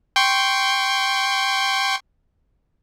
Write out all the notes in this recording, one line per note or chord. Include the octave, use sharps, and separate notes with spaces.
G5 C6 C#6